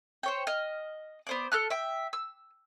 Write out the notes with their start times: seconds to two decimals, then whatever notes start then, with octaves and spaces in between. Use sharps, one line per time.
0.23 C5 C#5 G5
0.47 D#5 F6
1.27 B3 C5 D5
1.52 A4 F6 F#6
1.70 E5 G5
2.13 E6